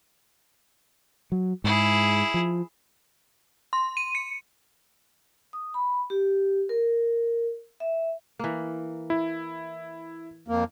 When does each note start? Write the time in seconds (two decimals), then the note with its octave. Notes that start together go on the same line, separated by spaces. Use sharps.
1.32 F#3
1.64 G#2 E4 G#4
2.34 F3
3.73 C6
3.97 D#7
4.15 C#7
5.53 D#6
5.74 B5
6.10 G4
6.69 A#4
7.80 E5
8.39 E3 A#3
9.10 E4
10.48 F2 A#3